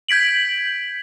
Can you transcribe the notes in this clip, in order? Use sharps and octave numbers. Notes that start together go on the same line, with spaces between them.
G6 G#6 B6 D7 F#7